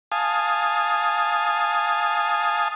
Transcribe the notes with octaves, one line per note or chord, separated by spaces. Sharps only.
F5 G#5 A5 D#6